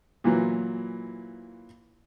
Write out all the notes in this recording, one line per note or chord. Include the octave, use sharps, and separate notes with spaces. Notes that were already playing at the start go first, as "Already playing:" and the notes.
A#2 E3 F#3